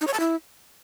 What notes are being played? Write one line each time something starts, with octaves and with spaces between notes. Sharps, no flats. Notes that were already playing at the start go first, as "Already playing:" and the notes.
D#4
C#5
A5
E4